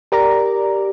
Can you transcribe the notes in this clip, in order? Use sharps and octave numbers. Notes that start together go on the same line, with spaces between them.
G4 A#4 D5 A#5